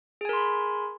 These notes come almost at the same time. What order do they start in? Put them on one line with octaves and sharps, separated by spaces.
G#4 G#5 A#4 C6 B5